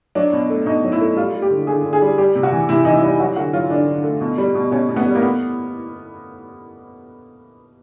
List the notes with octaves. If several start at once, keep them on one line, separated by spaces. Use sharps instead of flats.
F#3 D4
B2
A3
B2 D#4
F#3
E4
A3
G3 F4
G3
G4
D3
D3 G#4
D3
G#4
G3
G3 G4
C3
F#4
E3
C3 E4
E3 D#4
E4
G3
F#3 F#4
D3 F#4
F#3 F4
D3 D4
D3
A3
B2
G3
B2
B2 C#4
B2
B3
G3
A#3
A3 B3